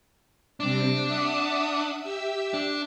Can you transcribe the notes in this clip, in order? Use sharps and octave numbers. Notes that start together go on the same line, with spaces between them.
C3 G3 C4 D4
E5 F#5 D#6
G4 E5 E6
D4